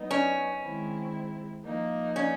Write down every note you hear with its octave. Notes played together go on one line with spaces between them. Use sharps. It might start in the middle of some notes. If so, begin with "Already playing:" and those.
Already playing: F#3 B3 D#4
C#4
D#3 G#3 C4 E4
F3 A#3 D#4
C#4